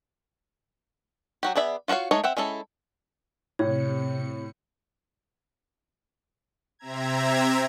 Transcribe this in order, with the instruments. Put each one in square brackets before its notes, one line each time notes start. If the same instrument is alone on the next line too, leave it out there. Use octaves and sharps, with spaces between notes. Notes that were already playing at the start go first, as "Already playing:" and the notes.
[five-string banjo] F#3 F#4 G4
B3 G#4 D5 E5
F4 F#4 A#4 C#5 F5
G#3 A3 D#4 C#5
C4 E5 F#5 G5
G#3 C#4 E4 A4
[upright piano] A2 [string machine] C3 C#7 [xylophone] C#5
[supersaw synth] C3 C4 E5 A#5 G#6